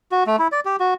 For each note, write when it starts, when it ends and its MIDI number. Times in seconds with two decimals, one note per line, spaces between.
0.12 0.24 66
0.27 0.36 57
0.39 0.48 64
0.52 0.60 74
0.65 0.76 67
0.80 0.94 66